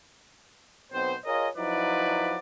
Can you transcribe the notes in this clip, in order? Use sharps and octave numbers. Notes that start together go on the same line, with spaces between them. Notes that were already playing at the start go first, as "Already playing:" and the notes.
B1 B2 C4 C5
F4 G#4 A#4 C#5 D#5
F3 F#3 D#4 E4 B4 D5